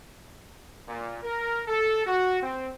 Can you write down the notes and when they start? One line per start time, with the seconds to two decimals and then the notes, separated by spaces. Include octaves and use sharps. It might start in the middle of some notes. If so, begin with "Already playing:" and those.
0.88 A#2
1.23 A#4
1.68 A4
2.06 F#4
2.42 C4